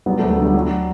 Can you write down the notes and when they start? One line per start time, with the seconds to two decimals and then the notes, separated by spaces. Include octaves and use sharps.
0.06 F#3 G3 B3
0.19 A3
0.23 D2
0.30 A3
0.38 D3 G3
0.54 F#3